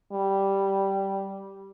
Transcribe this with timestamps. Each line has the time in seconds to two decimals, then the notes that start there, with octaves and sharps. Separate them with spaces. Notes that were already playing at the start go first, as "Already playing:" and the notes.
0.12 G3